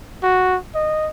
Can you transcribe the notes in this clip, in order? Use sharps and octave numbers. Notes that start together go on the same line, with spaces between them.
F#4
D#5